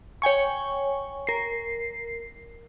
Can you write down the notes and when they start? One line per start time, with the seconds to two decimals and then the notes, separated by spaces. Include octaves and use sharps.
0.22 C#5 G5 G#5 C#6
1.27 A#4 C7